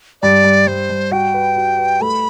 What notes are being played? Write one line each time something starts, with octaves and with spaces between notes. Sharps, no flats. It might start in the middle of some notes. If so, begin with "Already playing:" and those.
G2 D5
G2
G2 C5
G2
F#4 G5
B4
F#4
B4
A3 B5